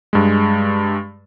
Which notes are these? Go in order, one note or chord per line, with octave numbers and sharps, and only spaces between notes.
G2 G#3